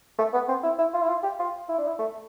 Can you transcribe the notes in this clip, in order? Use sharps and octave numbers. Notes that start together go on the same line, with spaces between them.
A3
B3
C4
E4
E4
F4
E4
F4
G4
F4
E4
D4
E4
A3